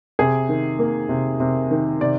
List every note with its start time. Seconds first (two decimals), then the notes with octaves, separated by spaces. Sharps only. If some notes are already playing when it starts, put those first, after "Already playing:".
0.19 C3 G#4
0.49 D#3
0.79 A#3
1.09 C3
1.40 C3
1.71 D#3
2.01 C3 D5